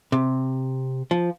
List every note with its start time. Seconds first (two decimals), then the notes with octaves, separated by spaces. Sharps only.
0.12 C3
1.11 F3